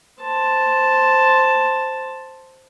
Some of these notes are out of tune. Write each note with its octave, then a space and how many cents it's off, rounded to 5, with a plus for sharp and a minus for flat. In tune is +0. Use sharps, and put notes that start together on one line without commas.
C5 +0 A5 +0